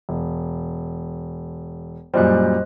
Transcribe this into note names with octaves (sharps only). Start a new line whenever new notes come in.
E1
F#2 A#2 G3 C5 D#5 F#6